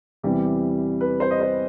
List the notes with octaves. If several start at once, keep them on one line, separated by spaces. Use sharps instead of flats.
E2 C3 E3 G3 C4 G4
B4
C5
D#5
C5